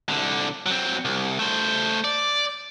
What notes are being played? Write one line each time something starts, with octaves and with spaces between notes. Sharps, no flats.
C2 D3
F#3 C4
C2
A3 C5
D5